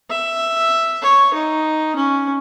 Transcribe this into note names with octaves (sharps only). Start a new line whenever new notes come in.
E5
C#5
D#4
C#4